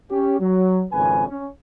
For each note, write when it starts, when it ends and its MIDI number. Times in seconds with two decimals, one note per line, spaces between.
0.11 0.37 61
0.11 0.37 67
0.40 0.84 54
0.93 1.25 32
0.93 1.25 41
0.93 1.25 49
0.93 1.25 71
0.93 1.25 80
1.28 1.48 61